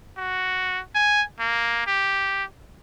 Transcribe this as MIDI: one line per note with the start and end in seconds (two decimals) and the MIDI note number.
0.18 0.81 66
0.95 1.23 80
1.40 1.86 58
1.87 2.44 67